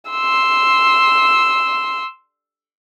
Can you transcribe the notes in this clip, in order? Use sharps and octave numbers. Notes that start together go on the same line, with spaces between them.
C6 E6